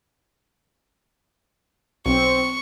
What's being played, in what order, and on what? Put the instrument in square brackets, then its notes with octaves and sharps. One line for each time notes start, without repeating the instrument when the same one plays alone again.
[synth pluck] B1 [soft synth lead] C4 [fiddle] C#6